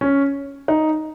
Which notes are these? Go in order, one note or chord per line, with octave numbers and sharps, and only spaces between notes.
C#4
D#4